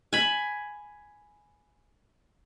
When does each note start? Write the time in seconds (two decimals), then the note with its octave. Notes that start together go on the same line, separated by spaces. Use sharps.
0.13 G#5 B5